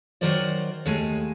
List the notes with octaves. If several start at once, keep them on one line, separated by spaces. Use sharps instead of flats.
D#3 F#3 A#4 C5 D5 D#5
D#2 G#3 A3 G#5